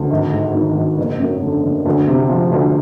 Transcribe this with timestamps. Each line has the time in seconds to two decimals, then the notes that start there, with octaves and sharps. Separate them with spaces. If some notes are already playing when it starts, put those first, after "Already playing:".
Already playing: D2
0.11 G#1
0.32 G#2
0.54 D#3
0.76 G#1
0.98 F#1
1.20 F#2
1.42 D3
1.63 F#1
1.86 D2
2.07 C3
2.29 F3
2.52 D2